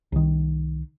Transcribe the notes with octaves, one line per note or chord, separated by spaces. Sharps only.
C2 D#3